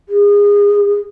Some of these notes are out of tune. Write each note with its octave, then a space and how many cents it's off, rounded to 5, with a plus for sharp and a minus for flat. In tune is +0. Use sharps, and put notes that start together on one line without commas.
G#4 -25